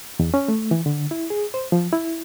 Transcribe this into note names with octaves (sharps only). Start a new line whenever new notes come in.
E2
C#4
A3
E3
D3
E4
G#4
C5
F3
E4